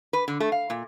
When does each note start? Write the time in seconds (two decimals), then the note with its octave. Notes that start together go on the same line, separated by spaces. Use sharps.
0.13 B4
0.28 D3
0.40 A3
0.52 F5
0.70 A#2